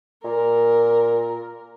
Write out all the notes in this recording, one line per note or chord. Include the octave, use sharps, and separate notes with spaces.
A#2 A#4